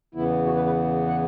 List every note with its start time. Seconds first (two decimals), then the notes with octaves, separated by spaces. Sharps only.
0.15 E2 C#3 E3 B3 E4
0.46 F#4
0.56 B4
0.66 B4
1.07 F#5